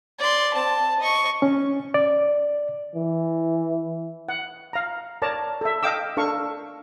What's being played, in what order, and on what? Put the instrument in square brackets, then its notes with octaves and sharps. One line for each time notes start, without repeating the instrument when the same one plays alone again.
[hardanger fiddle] D5 C6
C4 A5
D#5 C#6
[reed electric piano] C#4
D5
[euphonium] E3
[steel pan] F#5
F5 A#5
A#4 C#5 D5 A5 A#5
A4 E5
D#5 F5 G5 D6 E6
D4 A4 A#4 F5 C#6